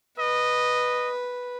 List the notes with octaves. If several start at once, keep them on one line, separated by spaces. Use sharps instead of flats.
B4 D#5